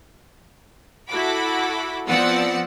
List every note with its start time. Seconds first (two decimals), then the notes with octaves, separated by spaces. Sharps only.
1.08 E4 F#4 A4 F#5 B5 D6
2.07 F3 B3 C4 D5 F#5 E6